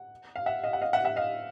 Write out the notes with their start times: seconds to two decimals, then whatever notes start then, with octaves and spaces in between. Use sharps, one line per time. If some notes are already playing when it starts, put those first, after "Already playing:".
Already playing: F#5
0.36 F5
0.46 E5 F#5
0.64 D#5 F5
0.73 F#5
0.82 D#5 F5
0.93 E5 F#5
1.05 E5 F#5
1.16 D#5 F5